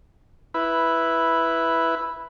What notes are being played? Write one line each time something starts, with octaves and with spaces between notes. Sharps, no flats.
E4 B4